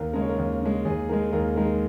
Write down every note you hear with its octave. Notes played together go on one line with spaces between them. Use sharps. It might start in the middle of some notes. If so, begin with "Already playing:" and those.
Already playing: D#2 A#4
C#3 G#3 A#4
C#5
A#4
D#2
C#3 G#3
D#2 G#4
D#3 G#3 A#4
D#2 A#4
D#3 G#3 A#4